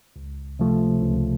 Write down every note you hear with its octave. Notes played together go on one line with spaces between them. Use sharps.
C#2
C3 F3 A3
C#2